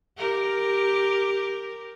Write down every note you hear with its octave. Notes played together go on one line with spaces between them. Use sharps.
G4 A#4